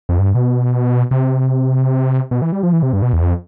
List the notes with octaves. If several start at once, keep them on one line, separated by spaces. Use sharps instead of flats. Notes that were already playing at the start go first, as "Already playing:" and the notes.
F2
G2
B2
C3
B2
E3
G3
F3
E3
C3
G2
B2
E2
F2